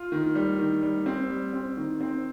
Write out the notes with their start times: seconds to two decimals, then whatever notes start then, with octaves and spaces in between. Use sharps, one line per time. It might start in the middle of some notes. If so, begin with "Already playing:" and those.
Already playing: F4
0.12 D#3
0.35 G3
0.59 D#3
0.82 G3
1.06 C4
1.29 G3
1.53 C4
1.77 D#3
2.01 C4